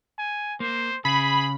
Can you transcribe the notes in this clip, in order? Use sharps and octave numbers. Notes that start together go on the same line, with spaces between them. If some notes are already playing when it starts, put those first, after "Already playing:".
G#5
A#3 C5
C#3 G#4 B5